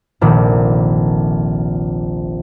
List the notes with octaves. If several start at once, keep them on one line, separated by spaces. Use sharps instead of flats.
F1 A#1 A#2 D#3